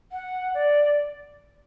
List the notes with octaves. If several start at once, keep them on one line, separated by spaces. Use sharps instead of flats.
F#5
D5